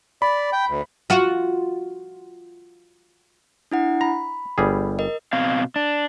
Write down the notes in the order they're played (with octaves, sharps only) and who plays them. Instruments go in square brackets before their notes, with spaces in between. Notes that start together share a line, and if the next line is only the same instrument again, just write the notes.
[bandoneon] D5 [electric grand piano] B5
[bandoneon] G5
D2
[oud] F4 F#4
[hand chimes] D4 E4 F#5
[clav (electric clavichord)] A#5 [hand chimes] B5
[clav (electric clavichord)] G1 G3 G#4
[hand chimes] A#4 D#5
[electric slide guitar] B2 C4 F5
D4